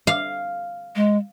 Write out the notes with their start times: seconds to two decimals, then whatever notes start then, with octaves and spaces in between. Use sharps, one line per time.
0.07 F5
0.96 G#3